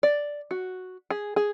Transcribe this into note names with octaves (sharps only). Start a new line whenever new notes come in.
D5
F#4
G#4
G#4